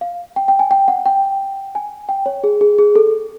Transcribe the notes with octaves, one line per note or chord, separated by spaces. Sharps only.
F5
G5
G5
G#5
G5
F#5
G5
G#5
G5
C#5
G#4
G#4
G#4
A4